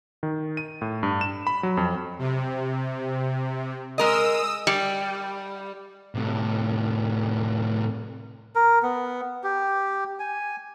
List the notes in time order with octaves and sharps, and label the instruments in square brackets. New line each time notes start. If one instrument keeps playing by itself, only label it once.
[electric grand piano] D#3
D#7
A2
G2
E7
B5
F#3
F2
[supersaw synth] C3
[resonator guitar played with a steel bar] G#3 A#4 D#5 [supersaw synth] D#6 E6
[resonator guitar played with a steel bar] G3
[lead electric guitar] A2 C3
[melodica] A#4
B3
G4
G#5